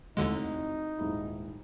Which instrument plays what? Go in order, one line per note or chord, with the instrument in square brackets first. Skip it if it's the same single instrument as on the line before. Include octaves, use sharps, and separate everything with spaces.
[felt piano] F1 A2 F#4 [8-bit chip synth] D#2 D3 G#3 [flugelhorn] D#4
[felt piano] D#1 G#2 E4